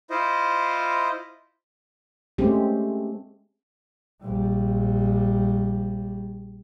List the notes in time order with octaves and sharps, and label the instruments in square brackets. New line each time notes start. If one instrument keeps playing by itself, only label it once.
[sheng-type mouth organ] E4 F4 C5 D#5
[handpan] G#3 A3 C4 C#4 G4
[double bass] A#1 G3